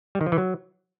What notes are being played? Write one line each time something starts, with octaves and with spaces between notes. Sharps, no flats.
G3
D#3
F3
E3
F#3